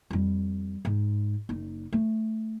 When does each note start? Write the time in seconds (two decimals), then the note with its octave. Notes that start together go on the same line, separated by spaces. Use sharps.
0.10 F2 G3
0.85 G#2
1.49 F#1 D#4
1.93 A3